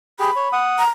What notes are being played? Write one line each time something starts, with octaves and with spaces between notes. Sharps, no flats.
G4 G#4 B5
C#5
F#5 D#6
A#5